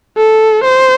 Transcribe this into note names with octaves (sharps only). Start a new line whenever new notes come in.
A4
C5